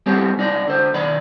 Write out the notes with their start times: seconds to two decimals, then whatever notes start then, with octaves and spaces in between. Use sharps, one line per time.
0.06 G3 C4 G4 A4 C5 C#5
0.38 C2 D#4 D5
0.68 D3 C5
0.94 B1 D#3 D5 B5